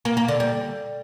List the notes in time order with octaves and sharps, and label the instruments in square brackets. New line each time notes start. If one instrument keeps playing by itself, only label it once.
[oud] A#3
A#3
D3
G3